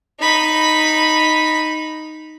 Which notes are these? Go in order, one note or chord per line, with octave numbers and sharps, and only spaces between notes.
D#4 B5